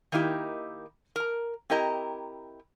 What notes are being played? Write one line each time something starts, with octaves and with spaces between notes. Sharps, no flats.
D#3 A#3 D#4 E4 G4
A#4 A#5
C4 E4 G4 A#4 D#5 A#5